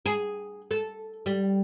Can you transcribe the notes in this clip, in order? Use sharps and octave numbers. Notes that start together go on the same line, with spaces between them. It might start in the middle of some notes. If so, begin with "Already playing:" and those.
G#4
A4
G3